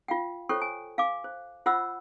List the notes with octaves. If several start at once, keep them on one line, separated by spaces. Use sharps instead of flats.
F4 F5 G5
F4 A4 C5 C#5 G5 C#6
G#5
F5 G#5 D6
C5
F4 C5 D#5 F#5 B5 E6